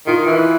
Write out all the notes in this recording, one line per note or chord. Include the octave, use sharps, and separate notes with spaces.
D#3 F4
E3